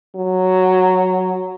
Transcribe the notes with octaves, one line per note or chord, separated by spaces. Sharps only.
F#3